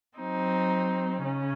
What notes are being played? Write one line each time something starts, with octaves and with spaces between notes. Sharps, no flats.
F#3 C4 D#4
C#3 C#4